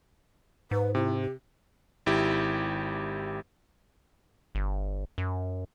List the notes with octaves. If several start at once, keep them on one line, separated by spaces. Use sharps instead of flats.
G#2 B4
C3 E4
G4
G#1 E4 G4
G1
F#2